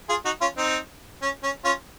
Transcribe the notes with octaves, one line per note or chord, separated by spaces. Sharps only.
F4 G#4
D#4 F#4
C#4 F4
C4 D#4
C#4
C#4
C#4 F4